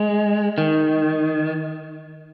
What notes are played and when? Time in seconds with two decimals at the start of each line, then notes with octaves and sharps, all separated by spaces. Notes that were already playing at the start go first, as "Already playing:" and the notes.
Already playing: G#3
0.58 D#3